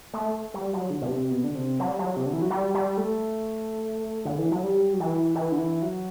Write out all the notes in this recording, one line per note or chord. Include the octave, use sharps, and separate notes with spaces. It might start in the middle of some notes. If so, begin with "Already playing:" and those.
A3
G3
F#3
D3
B2
C3
B2
D3
C3
F#3
G3
F#3
C3
D3
E3
F#3
G3
G3
A3
D3
E3
F#3
G3
F#3
E3
E3
D3
E3
F#3